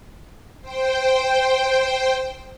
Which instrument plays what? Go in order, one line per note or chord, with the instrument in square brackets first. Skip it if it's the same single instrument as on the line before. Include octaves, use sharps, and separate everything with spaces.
[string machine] C5 G5